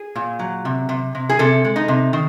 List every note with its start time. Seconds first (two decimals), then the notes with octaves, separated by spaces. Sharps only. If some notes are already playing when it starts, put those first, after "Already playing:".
Already playing: G#4
0.16 A#2
0.39 F#3
0.65 C3
0.89 C3
1.15 C3
1.29 G#4
1.39 C3 A4
1.64 G#3
1.76 D#4
1.88 C3
2.13 D#3